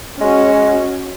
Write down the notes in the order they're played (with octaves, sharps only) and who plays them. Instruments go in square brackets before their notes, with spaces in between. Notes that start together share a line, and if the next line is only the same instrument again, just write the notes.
[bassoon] G#3 [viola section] C#4 F#4